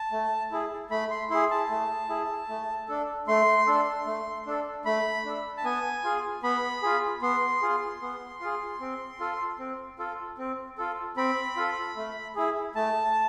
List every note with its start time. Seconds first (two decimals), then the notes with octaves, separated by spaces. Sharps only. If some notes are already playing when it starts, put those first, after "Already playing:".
Already playing: A5
0.12 A3
0.51 E4 G#4
0.91 A3 B5
1.11 C6
1.30 E4 G#4 C6
1.51 A5
1.70 A3
2.09 E4 G#4
2.49 A3
2.88 D4 A4
3.28 A3 C6
3.67 D4 A4
4.06 A3
4.46 D4 A4
4.85 A3 B5
5.25 D4 A4
5.57 A5
5.65 B3 G#5
6.04 F4 G#4
6.43 B3 B5
6.83 F4 G#4
7.22 B3 C6
7.62 F4 G#4
8.02 B3
8.41 F4 G#4
8.80 C4
9.20 F4 A4
9.59 C4
9.99 F4 A4
10.38 C4
10.78 F4 A4
11.17 C4 B5
11.57 F4 A4
11.96 A3
12.36 E4 G#4
12.75 A3 A5